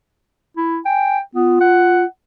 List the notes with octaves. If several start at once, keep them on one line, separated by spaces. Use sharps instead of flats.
E4
G5 G#5
B3 F4
F#5